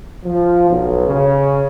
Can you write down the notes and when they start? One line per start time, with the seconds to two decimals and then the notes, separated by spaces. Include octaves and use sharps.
0.24 F3
0.69 B1
1.07 C#3